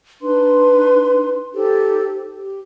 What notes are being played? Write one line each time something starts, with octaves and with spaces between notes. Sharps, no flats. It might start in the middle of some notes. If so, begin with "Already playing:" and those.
D4 D#4 B4 C6
D#4 G4 A4 C5
G4